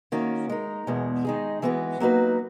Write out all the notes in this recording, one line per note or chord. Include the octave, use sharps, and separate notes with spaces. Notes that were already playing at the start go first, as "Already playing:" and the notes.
D#3 A#3 C#4 F#4
G#3 D#4 A#4
E2 B2 G#3 B3
D#3 G#3 D#4 G#4
E3 G#3 B3 F#4 B4
F#3 A#3 D#4 F#4 B4